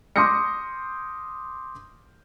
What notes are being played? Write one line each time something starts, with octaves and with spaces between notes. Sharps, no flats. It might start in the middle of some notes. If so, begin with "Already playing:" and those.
C6 D6 D#6 G6 A#6 C#7